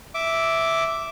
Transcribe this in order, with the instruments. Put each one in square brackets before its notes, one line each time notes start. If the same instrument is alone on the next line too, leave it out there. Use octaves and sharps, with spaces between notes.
[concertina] E5 D6